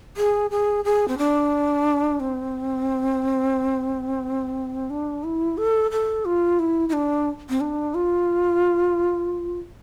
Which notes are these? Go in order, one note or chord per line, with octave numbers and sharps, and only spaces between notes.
G#4
G#4
G#4
C4
D4
C4
D4
E4
A4
A4
F4
E4
E4
D4
C4
D4
F4